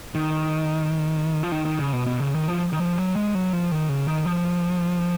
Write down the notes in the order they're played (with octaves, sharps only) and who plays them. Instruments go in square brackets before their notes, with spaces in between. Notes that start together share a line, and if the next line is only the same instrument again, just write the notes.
[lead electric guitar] D#3
F3
D#3
D#3
C#3
B2
B2
C#3
D#3
F3
D#3
F3
F#3
G#3
F#3
F3
D#3
C#3
D#3
F3